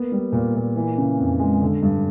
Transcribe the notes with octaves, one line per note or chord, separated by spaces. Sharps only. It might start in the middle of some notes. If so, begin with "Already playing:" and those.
Already playing: A#3 B3
G3
A#2
A#2
E3
C#3
F2
G#3
D3
G2